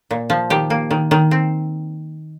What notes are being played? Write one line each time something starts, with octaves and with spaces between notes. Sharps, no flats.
A#2
F3
D#3 G4
A#3
D#3
D#3
C4